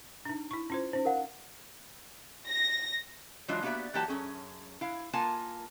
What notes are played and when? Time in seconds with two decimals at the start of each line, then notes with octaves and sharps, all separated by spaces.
0.25 D4 D#4
0.51 E4 C#6
0.70 C#4 F4 C5
0.93 C#4 D#4 C5
1.05 A#4 F5 F#5
2.48 A#6
3.48 E3 F#3 G#3 D4 F4
3.63 A#3 B3 F#4 G4 D5 E5
3.94 E3 F#3 A#3 G4 F#5 A5
4.08 F#2 A#2 C#4 G#4
4.81 E4 F5
5.13 A#3 F4 A#4 G#5 A5